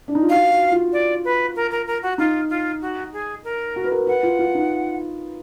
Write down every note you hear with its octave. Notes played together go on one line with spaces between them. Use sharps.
D4
D#4
F4
F#4 F5
F#4
F4
D5
B4
A#4
A#4
A#4
F#4
D#4 F4
F4
F#4
G#4
A#4
F#4
B4
A#4
B4 F#5
F4
F4
D#4